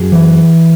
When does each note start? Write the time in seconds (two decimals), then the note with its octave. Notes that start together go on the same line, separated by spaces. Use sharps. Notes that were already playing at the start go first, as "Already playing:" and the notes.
Already playing: F#2 G#4
0.12 E3